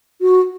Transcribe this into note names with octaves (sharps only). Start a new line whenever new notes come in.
F#4